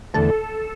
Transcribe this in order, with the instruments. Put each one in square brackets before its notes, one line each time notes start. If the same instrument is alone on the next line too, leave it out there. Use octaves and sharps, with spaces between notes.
[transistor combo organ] E2 D3 A3 [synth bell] A4